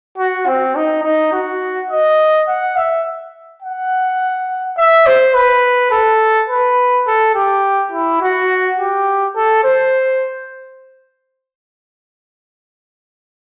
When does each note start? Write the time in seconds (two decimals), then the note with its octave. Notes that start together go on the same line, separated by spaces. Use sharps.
0.18 F#4
0.47 C4
0.76 D#4
1.04 D#4
1.33 F#4
1.91 D#5
2.48 F#5
2.77 E5
3.62 F#5
4.77 E5
5.06 C5
5.35 B4
5.91 A4
6.50 B4
7.07 A4
7.35 G4
7.92 E4
8.21 F#4
8.79 G4
9.36 A4
9.64 C5